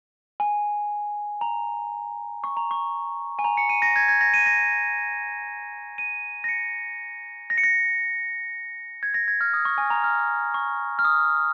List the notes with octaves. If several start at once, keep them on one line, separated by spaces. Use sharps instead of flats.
G#5
A#5
C#6
A#5
C#6
G#5
A#5
C#7
D#7
A#6
G#6
G#6
A#6
D#7
A#6
D#7
A#6
C#7
A#6
C#7
A#6
G#6
A#6
G#6
F6
D#6
C#6
G#5
A#5
F6
C#6
F6
D#6